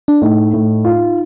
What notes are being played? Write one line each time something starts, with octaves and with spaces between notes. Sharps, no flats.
D4
A2 D#4
A2
F4